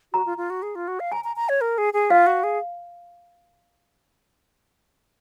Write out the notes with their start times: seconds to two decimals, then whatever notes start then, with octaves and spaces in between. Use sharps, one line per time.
0.13 F#4 A#5
0.26 F4
0.38 F4
0.50 F#4
0.62 G#4
0.75 F4
0.88 F#4
1.00 F5
1.12 G#5 A#5
1.24 A#5
1.36 A#5
1.49 C#5
1.61 A#4
1.78 G#4
1.93 G#4
2.10 F4 F5
2.27 F#4
2.44 G#4